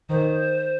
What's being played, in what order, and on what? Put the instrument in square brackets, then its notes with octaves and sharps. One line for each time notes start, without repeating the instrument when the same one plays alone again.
[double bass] D#3 [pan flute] C5